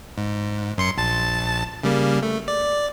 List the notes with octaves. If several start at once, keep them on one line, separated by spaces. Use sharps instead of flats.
G#2
F#2 C6 C#7
A#1 A5 A6
C#3 G3 A#3
A3
D5